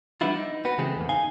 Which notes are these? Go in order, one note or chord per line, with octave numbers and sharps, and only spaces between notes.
F3 G3 B3 D4 E4 F4
D#4
B3 F#4 B4
C#3 E3 G#3 A3 C4 G4
E2 G#2 A#3
D#4 F5 G#5